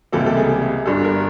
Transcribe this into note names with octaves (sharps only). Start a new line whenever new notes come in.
C#2 C3 E3 G3 A#3 A4
A4
G#4
G#4
G1 G2 D3 A4
A#4